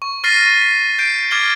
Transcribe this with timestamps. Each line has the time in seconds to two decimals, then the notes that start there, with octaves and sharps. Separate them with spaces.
0.02 C#6
0.24 C#6 F6 A6 A#6 C7 D#7
0.57 B6
0.99 G6 C7 D7
1.31 D6 F6 G#6 A6 C7 G7